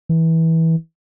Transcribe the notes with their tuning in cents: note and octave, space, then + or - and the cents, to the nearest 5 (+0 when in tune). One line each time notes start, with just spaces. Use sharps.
E3 -20